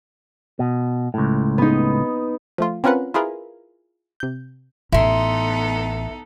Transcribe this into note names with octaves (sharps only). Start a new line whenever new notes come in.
B2
C#2 A2
B3 D#4
F3 A3 F4
C4 C#4 F4 A#4 B4 F#5
E4 F4 G#4 A#4 B4
C3 G6
A1 B3 D#4 E4 A4 C6